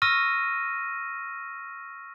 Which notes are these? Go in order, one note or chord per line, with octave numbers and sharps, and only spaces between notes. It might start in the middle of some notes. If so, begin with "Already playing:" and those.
C#6 E6 F6 A#6 D#7